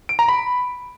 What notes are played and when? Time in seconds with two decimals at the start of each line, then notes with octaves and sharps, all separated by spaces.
0.09 D7
0.19 A#5
0.28 B5